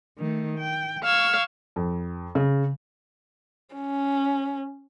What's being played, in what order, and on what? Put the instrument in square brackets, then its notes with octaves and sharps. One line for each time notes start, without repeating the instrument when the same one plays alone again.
[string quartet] D#3 A3
G5
F5 C#6 E6 G#6
[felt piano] F2
C#3
[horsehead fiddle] C#4